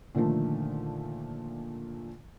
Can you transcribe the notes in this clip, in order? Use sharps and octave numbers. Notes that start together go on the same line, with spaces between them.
A#2 D3 D#3 F3 A3